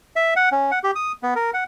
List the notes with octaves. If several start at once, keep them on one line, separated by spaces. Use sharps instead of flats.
E5
F#5
C#4
F#5
G4
D#6
B3
A#4
F#5